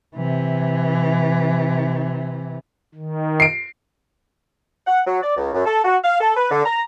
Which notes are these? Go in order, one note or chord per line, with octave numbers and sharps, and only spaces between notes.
C3 E3
D#3
C7 D7
F#5
F#3
D5
C#2
F#2
A4
F#4
F5
A4
B4
D3
A#5